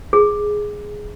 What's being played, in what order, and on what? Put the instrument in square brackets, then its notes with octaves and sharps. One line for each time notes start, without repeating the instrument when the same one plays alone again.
[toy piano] G#4